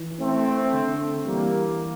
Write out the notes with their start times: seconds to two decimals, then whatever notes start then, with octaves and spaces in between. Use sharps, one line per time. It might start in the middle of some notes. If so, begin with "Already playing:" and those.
Already playing: E3
0.20 A3 C4
0.73 D3
1.26 E3 G3 A#3